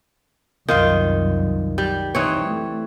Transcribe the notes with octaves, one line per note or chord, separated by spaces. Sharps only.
C2 F#2 D#3 F4 F5
G3
E3 C4 D#4 C#5
A3